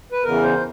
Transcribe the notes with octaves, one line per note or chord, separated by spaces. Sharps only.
B4
E2 C#3 E3 A#4
C5